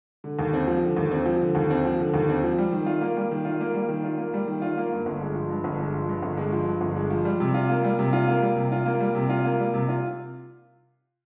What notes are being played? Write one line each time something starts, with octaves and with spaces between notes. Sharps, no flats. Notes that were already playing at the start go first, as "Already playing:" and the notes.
D3
D#2
C4
F3
D3
D#2
C4
F3
D3
D#2
C4
F3
D3
D#2
C4
F3
G3
D#3
F4
A#3
G3
D#3
F4
A#3
G3
D#3
F4
A#3
G3
D#3
F4
A#3
G2
G1
G#3
F3
G2
G1
G#3
F3
G2
G1
G#3
F3
G2
G1
G#3
F3
G3
C3
F4
A#3
G3
C3
F4
A#3
G3
C3
F4
A#3
G3
C3
F4
A#3
G3
C3
F4